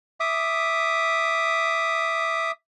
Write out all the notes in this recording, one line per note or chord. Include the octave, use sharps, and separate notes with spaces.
E5 D6 D#6